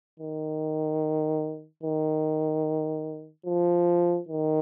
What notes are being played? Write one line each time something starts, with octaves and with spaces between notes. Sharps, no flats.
D#3
D#3
F3
D#3